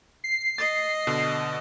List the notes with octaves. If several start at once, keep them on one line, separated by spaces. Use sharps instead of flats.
C7
D#5 A6
B2 D3